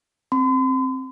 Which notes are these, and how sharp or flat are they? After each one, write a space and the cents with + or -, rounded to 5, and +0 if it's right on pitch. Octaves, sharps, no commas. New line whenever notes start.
C4 +15 C6 -45